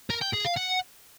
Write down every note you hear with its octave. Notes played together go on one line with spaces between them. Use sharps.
A#4
G5
G#4
F5
F#5